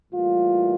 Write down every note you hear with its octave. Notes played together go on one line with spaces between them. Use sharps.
A2 E3 G3 A#3 F4